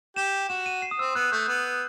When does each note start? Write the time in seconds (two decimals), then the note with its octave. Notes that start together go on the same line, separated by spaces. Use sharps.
0.16 G4 E7
0.49 F#4 E7
0.66 D#7
0.82 C7
0.91 D#6
0.99 C4 E6
1.15 B3 F#6
1.32 A3 G6
1.48 B3